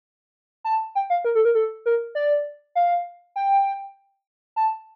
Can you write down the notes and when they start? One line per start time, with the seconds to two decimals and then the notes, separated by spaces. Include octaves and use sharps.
0.64 A5
0.95 G5
1.10 F5
1.25 A#4
1.35 A4
1.45 A#4
1.55 A4
1.86 A#4
2.15 D5
2.75 F5
3.36 G5
4.56 A5